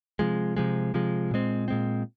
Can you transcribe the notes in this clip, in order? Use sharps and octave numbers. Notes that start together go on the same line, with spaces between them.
C3 F3 G#3
C3 F3 G#3
C3 F3 G#3
A#2 G#3 C4
A#2 G#3 C4